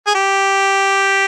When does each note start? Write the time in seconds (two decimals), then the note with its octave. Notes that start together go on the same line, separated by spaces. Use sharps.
0.07 G#4
0.15 G4